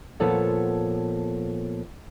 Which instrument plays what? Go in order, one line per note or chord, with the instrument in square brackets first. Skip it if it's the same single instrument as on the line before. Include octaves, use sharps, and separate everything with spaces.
[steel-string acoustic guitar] A#2 F3 B3 A4 C#5 F#5